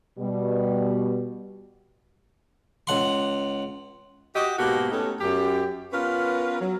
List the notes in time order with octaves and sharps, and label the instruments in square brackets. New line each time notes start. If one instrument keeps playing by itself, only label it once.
[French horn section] B2 G3
[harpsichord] C#2 F#5 C6
[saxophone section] F#4 G4 D#5
G#2 B2 A#3 F#4 G4
A3 B3 C#4 D#4 G4 A4
F#2 G4
B3 C#4 F4 A#4 B4
F#3